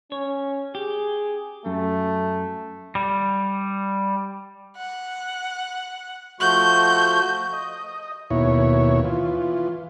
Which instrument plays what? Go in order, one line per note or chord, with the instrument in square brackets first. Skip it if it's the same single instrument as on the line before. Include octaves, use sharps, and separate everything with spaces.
[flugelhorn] C#4 [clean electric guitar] C#5
[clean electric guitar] G4 [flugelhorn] G#4
[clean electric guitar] F#2 [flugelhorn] A3
[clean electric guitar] G3
[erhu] F#5
[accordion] F3 A3 F#4 [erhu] G6
[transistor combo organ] D#5
D#2 B2 E4 C#5
E3 F4